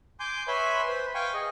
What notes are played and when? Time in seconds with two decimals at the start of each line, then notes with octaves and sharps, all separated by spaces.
0.20 G#5 C6 D6 G6
0.48 B4 C#5 E5 G#5 B5 C6
0.88 B4 C5
1.15 F5 G5 G#5 C#6
1.34 G#4 D#5